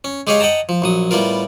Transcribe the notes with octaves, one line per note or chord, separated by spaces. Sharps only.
C#4
G#3 G4 G#4 C#5 D#5 F5
D#5 F#5 G5 A5 A#5
F3
A#1 F#3 D#6
A2 G3 B3 F4 A#4